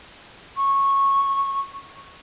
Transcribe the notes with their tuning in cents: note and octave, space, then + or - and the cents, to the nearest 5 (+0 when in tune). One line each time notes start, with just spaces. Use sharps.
C#6 -15